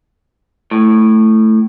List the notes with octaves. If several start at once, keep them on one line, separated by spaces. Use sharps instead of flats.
A2